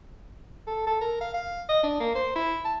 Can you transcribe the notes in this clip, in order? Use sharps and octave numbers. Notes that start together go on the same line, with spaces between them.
A4
A4
A#4
F5
F5
D#5
D4
A#3
C5
E4
A5